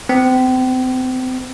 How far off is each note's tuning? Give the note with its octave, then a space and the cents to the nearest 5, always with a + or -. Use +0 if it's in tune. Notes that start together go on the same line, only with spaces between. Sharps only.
C4 -35